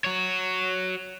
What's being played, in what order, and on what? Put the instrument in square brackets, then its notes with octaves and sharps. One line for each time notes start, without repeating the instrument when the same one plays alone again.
[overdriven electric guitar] F#4 C#5